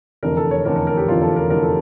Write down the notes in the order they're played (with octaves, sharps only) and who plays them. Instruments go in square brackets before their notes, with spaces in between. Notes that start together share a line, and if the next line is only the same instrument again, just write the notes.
[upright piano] F1 E2 D3 A#4
A4
C#5
F1 E2 D3 A#4
A#4
A#4
G4
F1 E2 D3 F4
A4
A#4
F1 E2 D3 A#4
A4